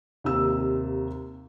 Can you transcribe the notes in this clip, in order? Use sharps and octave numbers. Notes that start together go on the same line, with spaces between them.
D#2 C3 E6